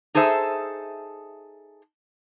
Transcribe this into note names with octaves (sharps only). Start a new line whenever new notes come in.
D#4 G#4 A4 C5 E5